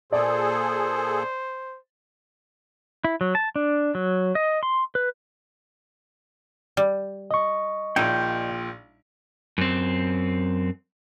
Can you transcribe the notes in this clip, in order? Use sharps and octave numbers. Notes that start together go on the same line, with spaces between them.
A#2 G#4 A4 C5 D5
E4
F#3
A5
D4
F#3
D#5
C6
B4
G3
D#5 C#6
A#1 A#2 D#4 E4 G5
F#2 C4